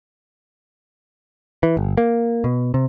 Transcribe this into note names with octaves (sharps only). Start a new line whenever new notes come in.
E3
G1
A#3
B2
C3